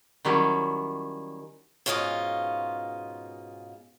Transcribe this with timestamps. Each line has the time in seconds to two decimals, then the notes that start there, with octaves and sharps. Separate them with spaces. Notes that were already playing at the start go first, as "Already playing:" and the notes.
0.25 D#3 F#3 G3 C#4 E4
1.86 G#2 B2 C#4 F4 G4 D#5